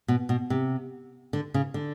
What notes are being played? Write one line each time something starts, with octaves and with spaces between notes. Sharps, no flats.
B2
B2
C3
D3
C#3
D3